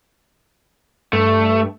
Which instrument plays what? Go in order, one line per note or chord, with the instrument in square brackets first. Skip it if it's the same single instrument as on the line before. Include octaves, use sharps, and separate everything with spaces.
[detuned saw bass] G2 [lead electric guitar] A3